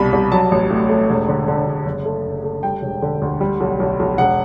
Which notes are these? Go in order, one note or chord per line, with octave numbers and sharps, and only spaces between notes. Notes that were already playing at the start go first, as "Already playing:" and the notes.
Already playing: C2 B2 G3 B5
C2
F#3 A5
A1
A2
A3
E1
D3
D3
E1
F#1
A3
F#1
A3
G3 G5
E1
D3
D2
G3
B1
B1
B1
E1 F#5